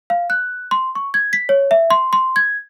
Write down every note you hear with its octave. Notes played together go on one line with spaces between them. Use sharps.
F5
F#6
C6
C#6
G#6
B6
C#5
E5
C6
C6
G#6